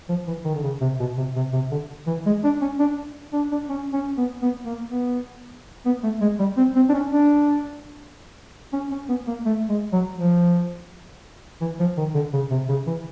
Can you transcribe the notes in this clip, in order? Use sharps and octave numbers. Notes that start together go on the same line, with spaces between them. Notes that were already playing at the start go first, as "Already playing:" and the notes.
F3
E3
D#3
D3
C#3
C3
B2
C3
C3
C3
D3
E3
G#3
D4
C#4
D4
D4
D4
C#4
C#4
B3
B3
A#3
B3
B3
A3
G#3
G3
C4
C4
D4
C#4
D4
C#4
C#4
B3
A#3
A3
G#3
F#3
F3
E3
F3
D#3
D3
C#3
C3
C#3
E3